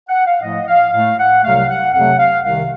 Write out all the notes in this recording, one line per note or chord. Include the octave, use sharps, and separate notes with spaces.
F#5
F5
A2 F3 A3 D#5
F5
A2 A3 F5
F#5
C2 C3 F#3 A3 F5
F#5
F2 C3 F#3 A3 F#5
F5
C2 C3 D#3 F5